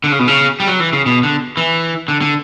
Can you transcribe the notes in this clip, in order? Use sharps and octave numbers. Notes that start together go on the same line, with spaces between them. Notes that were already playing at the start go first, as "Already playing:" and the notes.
D3
C#3
B2
C#3
G3
F#3
E3
C#3
B2
D3
E3
D3
D3